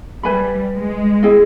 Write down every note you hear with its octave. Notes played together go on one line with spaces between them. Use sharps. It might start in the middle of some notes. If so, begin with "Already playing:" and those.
G3 B4 E5 G#5 B5
G#3
E4 G#4 D#5 G5